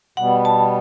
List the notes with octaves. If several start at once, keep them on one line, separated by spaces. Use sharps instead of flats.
B2 G3 B3 F#5
A5